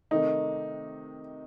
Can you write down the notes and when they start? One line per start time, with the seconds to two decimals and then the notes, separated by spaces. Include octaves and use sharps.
0.11 C3 D#3 A3 D#4